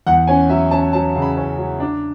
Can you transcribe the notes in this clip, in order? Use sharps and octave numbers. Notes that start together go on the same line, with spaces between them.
E2 F#5
C#4 G#5
F#3 E5
C#4 A5
F#3 A5
C#3
B5
C#4
F#3
D4